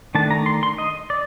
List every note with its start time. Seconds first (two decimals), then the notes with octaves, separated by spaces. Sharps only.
0.15 D#3 A3 D4 A5
0.31 A#5
0.46 C6
0.63 C6
0.78 D#5
1.10 D5